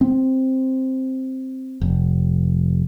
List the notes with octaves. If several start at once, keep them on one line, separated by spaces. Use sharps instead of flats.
C4
F1